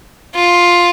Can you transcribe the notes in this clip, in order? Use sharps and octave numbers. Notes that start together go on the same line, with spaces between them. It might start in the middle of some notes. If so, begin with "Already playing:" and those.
F4